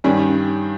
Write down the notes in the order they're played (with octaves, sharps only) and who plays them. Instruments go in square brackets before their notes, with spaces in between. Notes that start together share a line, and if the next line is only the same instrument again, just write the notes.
[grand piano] G2 D#3 G3 [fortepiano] C#4